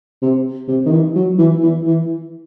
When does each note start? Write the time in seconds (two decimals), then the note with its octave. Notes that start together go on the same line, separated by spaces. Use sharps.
0.22 C3
0.68 C3
0.86 D#3
0.92 E3
1.16 F#3
1.39 E3
1.63 E3
1.87 E3